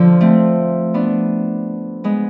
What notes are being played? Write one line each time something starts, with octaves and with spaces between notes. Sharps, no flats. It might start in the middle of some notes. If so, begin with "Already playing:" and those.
Already playing: D3 F3
A3 C4
B3 D4
G#3 B3